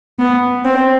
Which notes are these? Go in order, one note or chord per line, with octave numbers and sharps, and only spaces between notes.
B3
C4